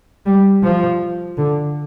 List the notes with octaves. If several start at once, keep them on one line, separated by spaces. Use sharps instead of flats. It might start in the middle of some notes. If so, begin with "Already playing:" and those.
G3
F3
D3